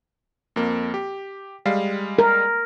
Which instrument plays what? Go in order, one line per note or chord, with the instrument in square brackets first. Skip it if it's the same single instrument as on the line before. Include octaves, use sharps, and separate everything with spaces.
[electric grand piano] F2 A#3
G4
G3 G#3 F5
[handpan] A#4